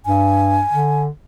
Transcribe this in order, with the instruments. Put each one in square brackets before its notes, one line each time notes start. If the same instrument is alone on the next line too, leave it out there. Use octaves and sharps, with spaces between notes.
[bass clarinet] G2 [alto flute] G#5
[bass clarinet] D3